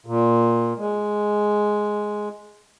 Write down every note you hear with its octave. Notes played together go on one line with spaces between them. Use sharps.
A#2
G#3